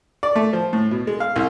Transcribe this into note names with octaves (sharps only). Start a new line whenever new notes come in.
D5
A3
F3
A2
B2
G#3
F5
C2